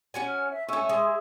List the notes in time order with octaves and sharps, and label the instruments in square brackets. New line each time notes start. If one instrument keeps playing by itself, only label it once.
[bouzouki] C#4 F#4 G#5
[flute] F6
E5
[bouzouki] A3 C#4 [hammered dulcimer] E5 G#5 [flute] C#6
[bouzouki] G#3 [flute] D#6
[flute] G#4